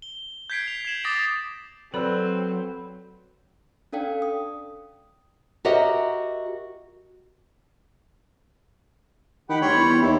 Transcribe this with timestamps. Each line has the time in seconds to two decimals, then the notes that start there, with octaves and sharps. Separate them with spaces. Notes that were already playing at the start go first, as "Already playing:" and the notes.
0.02 G7
0.50 G6 G#6 B6 C7 D7
0.68 F7
0.85 G#6 C7 E7 F#7
1.04 D6 D#6 A6 A#6 C7 D7
1.94 F#3 C4 A4 B4 D5 E6
3.93 C#4 D4 A4 D5 F5 G5
4.22 D#6
5.65 F#4 G4 A#4 D#5 E5
9.49 D#3 G4 F#5 B5
9.61 D2 G3 C#5 C6
9.74 E2
10.02 D#2 E4